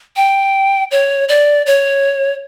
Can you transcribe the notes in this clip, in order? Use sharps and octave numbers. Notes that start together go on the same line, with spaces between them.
G5
C#5
D5
C#5